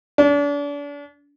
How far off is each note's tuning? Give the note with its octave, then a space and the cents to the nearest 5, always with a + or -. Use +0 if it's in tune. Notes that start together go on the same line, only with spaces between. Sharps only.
D4 -35